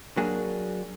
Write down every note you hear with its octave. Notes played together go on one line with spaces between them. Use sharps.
F#3 A#3 D4 G#4